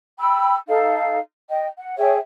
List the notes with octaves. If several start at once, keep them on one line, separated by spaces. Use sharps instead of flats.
G5 B5 E6
D#4 A4 F5
D#5 G5
F#5
G#4 C#5 E5 G5